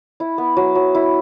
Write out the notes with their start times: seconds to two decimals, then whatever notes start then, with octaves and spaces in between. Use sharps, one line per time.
0.20 E4
0.38 B3
0.57 F#3
0.75 F#3
0.95 E4